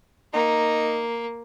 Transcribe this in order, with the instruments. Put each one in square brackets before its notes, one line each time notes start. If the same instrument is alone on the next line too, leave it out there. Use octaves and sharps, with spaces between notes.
[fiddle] A#3 [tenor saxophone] D#4